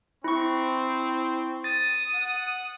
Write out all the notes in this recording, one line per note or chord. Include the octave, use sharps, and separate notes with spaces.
C4 E4 C#6
D#6 A6
F#5